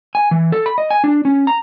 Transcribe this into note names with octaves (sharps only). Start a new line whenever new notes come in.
G#5
E3
A4
B5
D#5
G#5
D4
C#4
A#5